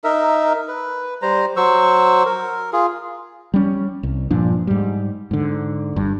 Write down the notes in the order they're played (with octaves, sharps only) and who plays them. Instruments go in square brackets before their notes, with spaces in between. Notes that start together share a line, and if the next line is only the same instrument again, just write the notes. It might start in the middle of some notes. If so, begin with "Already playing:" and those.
[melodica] D#4 A#4 E5
B4
G3 C5 A#5
F#3 C5 C#6 E6
A#4
F4 G#4
[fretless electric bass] G3 C#4
C2
G2 A#2 F3 D4
G#2 G3
G#2 D3
G1 G2